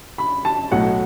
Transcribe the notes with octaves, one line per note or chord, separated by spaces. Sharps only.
B5
A5
B1 A2 F#3 F#5